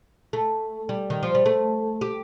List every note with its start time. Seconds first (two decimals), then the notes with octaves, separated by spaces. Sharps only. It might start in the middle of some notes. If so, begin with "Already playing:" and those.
0.33 A3
0.89 G3
1.10 D#3
1.23 F3
1.35 G3
1.46 A3
2.01 G4